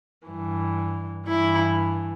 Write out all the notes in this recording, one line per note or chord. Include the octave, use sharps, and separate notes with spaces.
G2 E3
G2 E3 E4